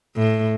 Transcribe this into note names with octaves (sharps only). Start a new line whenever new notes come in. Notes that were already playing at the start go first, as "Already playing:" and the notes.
A2